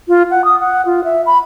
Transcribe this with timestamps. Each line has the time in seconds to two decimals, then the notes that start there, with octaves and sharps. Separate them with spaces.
0.08 F4
0.31 F#5
0.45 D#6
0.60 F#5
0.86 F4
1.04 E5
1.26 B5